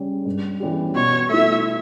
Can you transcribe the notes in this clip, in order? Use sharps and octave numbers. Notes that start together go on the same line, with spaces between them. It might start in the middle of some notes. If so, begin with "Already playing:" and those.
Already playing: C#3 G3 C#4
G2
E3 G3 C#4 G4
B2 C#5
A3 E4 E5